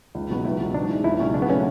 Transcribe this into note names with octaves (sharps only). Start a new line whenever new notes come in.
C#2
B2 F#3 B3
C#2 E4
B2 F#3
G#2 D4
E3 G#3
C#2 E4
B2 F#3 C#4
C#3 D4
B3
F#3 A3 C#4